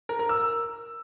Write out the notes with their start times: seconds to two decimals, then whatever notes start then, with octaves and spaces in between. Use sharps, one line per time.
0.09 A#4
0.19 A#4
0.29 E6